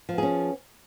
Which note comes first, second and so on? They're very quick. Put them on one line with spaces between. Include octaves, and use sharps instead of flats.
F3 B3 G#4 C#4